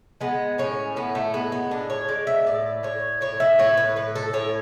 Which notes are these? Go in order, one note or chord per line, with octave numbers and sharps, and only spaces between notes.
G#3 B3
A2 C#4
A2 B3
A3
G#3 B3
B3
A2 D4
C#5
G#3 D5
E5
A2 D5
A2 C#5
A2 C#5
E5
A2 C#5
B4
A2 B4
A4
A2 C#5